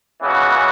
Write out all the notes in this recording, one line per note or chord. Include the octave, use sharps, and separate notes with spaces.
C#2 C#3 E3 B3 F#4